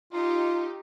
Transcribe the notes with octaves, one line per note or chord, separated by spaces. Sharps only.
D#4 F4 G4